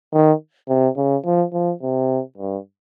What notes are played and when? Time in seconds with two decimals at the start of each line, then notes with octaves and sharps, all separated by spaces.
0.13 D#3
0.69 C3
0.97 C#3
1.25 F3
1.53 F3
1.82 C3
2.38 G2